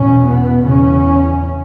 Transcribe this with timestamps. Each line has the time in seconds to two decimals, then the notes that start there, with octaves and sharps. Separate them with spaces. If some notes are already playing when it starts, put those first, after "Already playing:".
Already playing: E2 B2 C#4
0.28 B3
0.67 E2 C#3 C#4